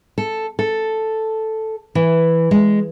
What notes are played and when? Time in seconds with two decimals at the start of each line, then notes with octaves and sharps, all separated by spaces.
0.18 A4
0.59 A4
1.95 E3
2.51 G#3